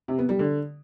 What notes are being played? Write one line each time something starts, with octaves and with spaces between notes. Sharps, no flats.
C3
B3
G3
D3